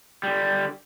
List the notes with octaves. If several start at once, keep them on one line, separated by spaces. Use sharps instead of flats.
D3 G3